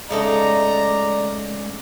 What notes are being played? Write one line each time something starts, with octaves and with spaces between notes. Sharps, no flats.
C#3 G#3 A3 D#4 D5 A#5